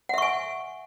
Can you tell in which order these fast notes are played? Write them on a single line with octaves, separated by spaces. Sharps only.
F#5 E5 C#6 G#5